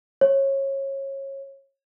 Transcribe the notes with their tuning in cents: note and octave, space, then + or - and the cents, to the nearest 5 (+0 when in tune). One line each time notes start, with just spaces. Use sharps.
C#5 -25